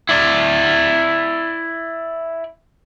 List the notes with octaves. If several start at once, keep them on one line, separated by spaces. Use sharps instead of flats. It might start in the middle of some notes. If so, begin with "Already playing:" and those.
E4 D5